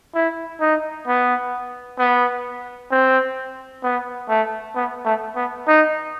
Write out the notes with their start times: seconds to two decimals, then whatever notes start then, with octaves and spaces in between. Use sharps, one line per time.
0.15 E4
0.60 D#4
1.07 B3
1.98 B3
2.91 C4
3.83 B3
4.29 A3
4.75 B3
5.05 A3
5.36 B3
5.67 D#4